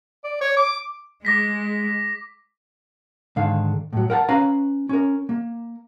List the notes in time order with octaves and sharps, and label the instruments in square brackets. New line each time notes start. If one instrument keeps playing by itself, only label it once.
[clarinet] D5
C#5
D6
[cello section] G#3 [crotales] D6 A#6 B6
[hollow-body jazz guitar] G#2 D3 D#3 A4 F5
A2 F#3
A#4 F#5 G5 A5
C#4 B4 F5 A#5
C#4 A#4
A#3